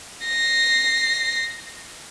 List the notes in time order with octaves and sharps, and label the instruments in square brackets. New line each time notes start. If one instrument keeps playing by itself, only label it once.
[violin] A#6 C7